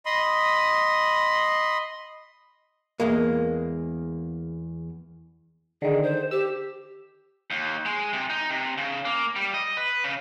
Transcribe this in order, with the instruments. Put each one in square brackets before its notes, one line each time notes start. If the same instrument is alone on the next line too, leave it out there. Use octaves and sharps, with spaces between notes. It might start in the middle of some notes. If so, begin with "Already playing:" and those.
[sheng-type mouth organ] D#5 B5 C6 D#6
[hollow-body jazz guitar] E2 G#3 A#3
[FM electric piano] D3 D#3 [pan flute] G#4
[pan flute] C5
[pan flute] G4 [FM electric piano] E6
[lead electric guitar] D#2
G#3
C3
D#4
C3
C#3
A#3
G3
D#5
B4
C#3